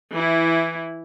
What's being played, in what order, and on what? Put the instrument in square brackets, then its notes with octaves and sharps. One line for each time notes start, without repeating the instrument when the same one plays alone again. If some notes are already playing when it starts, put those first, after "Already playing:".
[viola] E3 E4